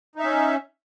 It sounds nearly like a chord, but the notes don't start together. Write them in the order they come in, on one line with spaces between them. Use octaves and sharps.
D#4 E5 C#4